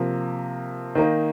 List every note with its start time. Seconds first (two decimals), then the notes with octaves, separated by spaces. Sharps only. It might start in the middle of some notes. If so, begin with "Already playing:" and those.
Already playing: C3 F3 A#3
0.95 D#3 A#3 D#4